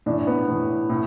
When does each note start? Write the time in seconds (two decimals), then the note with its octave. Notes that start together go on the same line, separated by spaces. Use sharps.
0.06 A2 E3 D4
0.27 B3
0.48 A2 E3
0.90 A2